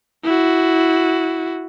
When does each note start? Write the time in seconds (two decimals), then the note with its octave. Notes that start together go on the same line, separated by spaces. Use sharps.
0.24 E4 F#4